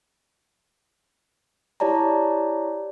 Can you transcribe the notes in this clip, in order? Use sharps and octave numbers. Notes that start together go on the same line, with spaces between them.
E4 G4 C#5 D5 A5 A#5